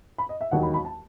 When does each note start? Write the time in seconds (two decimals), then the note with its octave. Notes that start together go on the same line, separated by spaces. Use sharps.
0.18 B5
0.29 D#5
0.41 E5
0.51 E1 D#2 D#3 F#3 F#5
0.63 B5
0.74 B5
0.85 A5